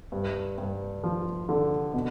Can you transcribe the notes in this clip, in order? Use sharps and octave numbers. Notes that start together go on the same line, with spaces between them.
G2
G2
F3
D3
B2